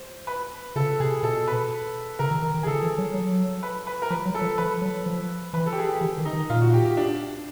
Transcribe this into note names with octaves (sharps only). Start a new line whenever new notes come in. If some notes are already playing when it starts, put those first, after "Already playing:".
Already playing: C5
B4
C#3 A4
C3 G#4
B2 A4
B4
C#3 A#4
D#3
D#3
D#3
G#4
D3 A4
E3
F#3
F#3
B4
B4
A#4
F3 B4
F#3
A4
F3
F3 B4
F#3
F3
E3 B4
A4
G4
G#4
G4
E3
D#3
D#4
D#3
A#2 F4
F#4
G4
G4
D4